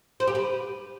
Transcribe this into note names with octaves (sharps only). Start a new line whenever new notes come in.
C5
G4
B4